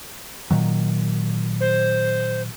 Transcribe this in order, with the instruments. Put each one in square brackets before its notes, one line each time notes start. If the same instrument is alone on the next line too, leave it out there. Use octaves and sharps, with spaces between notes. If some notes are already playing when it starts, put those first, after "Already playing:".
[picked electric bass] A#2 D#3 F#3
[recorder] C5